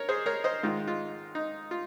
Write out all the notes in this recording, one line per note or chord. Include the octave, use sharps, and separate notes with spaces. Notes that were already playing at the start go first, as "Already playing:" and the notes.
Already playing: A#4 C#5
G#4 C5
A#4 C#5
C5 D#5
G#2 D#3 G#3 D#4 F4
F4
D#4
F4